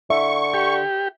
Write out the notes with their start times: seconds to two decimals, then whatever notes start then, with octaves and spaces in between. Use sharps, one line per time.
0.10 D3 E5 C#6
0.54 G4